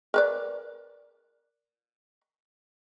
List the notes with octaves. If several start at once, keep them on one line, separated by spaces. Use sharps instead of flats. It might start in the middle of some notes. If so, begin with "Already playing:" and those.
A#4 B4 D5